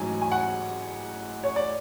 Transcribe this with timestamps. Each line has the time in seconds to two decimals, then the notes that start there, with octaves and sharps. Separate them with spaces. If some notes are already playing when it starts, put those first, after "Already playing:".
Already playing: A1 G#2 F#3 G#5
0.22 G#5
0.32 F#5
1.44 C#5
1.56 D5